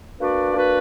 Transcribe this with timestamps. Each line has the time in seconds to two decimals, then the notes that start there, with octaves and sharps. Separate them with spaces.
0.18 A#3 D4 F#4 B4 D5
0.53 A#3 D4 F#4 B4 D5